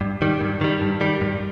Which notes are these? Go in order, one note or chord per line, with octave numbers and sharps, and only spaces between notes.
G2
D#3 G3
G2
D#3 G3
G2
D#3 G3
G2